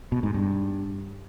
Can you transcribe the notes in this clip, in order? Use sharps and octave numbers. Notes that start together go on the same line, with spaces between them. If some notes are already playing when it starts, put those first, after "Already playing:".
B2
G#2
G2